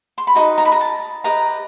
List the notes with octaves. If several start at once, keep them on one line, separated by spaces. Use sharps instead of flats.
C6
B5
D#4 F#4 B4 D#5 A#5
A#5
B5
A#5
A5
G4 B4 D#5 A#5